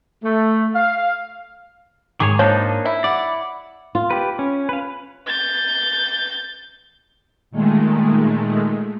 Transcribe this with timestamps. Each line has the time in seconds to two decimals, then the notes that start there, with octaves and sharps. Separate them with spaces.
0.23 A3
0.75 F5
2.20 G#2 D#3 G#4 C#5 D6
2.39 F3 A#3 D4 D#4 C#5
2.85 E4
3.04 D5 F#5
3.95 F4
4.11 G4 B4
4.39 C#4
4.69 B4 F5
5.27 G6 A6
7.51 A#2 D#3 G#3 A3